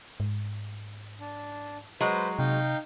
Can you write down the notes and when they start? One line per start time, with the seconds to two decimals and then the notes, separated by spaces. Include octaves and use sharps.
0.20 G#2
1.20 D4
2.01 F#3 G#3 B4 C5
2.39 C3 D#4 F5 G5